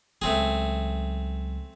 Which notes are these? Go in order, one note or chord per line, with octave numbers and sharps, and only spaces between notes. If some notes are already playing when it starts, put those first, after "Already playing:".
C#2 F#3 A3 C4 G#4